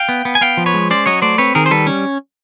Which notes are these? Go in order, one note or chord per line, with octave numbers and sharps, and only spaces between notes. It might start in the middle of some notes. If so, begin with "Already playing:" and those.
Already playing: F5 G5
B3
B3
G#5
B3 F5 G5
F3
B4 C#5
G#3
C#4 C5 D5
F#3 C#5 D#5
A3 C5 D5
C4 B4 C#5
D#3 G#4 A#4
C5
G3 A4 B4
C#4